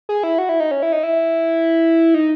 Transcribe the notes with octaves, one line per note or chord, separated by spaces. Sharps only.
G#4
E4
F#4
E4
D#4
C#4
E4
D#4
E4
D#4